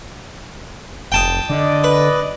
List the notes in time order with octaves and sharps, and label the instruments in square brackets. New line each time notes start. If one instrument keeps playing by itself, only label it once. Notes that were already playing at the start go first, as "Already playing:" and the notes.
[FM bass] F1 [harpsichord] G5 A5 D#6
[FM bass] D3 [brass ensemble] D5 D#5
[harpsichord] B4